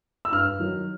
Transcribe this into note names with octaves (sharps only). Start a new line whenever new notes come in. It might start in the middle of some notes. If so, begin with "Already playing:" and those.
E6
G2 F6
D#3 F#3